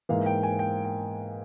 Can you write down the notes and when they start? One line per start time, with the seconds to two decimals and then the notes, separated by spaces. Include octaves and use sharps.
0.09 G#2 E3 A#3 F5
0.26 G5
0.43 G#5
0.59 G5
0.85 G5